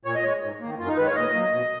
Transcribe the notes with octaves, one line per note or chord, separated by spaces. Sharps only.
A#2 C#5
D#5
G#3 C#5
G#2
D#3 A#3
F#2 F4
D#4
D#3 G#3 B4
C#5
F5
A#2 D#5
F#3 A#3
B2